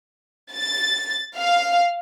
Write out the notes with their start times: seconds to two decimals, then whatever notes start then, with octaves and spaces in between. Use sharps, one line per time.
0.54 A6
1.37 F5